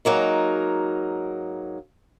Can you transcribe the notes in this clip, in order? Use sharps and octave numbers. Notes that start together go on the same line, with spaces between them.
G#2 F#3 A#3 D#4